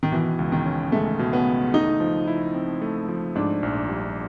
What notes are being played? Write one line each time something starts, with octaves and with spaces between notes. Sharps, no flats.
D#3
B2 E3
C#2
D#3
C#4
G#3 A3
B2
B3
C#2
A3 D#4
F3
E4
C4
A3
F3
G#2 D4
A#1
G3